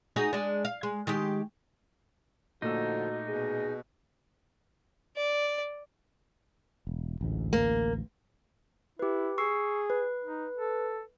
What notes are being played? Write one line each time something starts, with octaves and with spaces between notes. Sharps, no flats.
D#4 F#4 G#4
G#3 D4
F5
G#3
D#3 G#3 G4
A#2 D3 F3 A3 D#4 F#4 E6
B2 G#4
D5
E1
A1 D2 G#2
A#3
E4 G4 B4
G#4 C#6 E6 C7
B4
D#4
A4